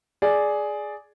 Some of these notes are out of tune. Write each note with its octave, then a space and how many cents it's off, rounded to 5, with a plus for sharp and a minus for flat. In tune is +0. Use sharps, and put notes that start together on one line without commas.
G#4 +10 D5 +0